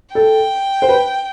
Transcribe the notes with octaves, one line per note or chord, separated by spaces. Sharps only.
A4 G5
C5
B4